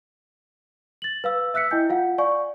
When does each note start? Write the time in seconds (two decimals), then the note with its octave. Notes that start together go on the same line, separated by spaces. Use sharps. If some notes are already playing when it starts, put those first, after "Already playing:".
1.02 A6 F#7
1.24 B4 F5 E6
1.54 E5 E6 F#6 B6 C#7
1.71 E4 D#5 G5 G#5 G6
1.89 F4 F5 F#5
2.18 D5 F5 G#5 C#6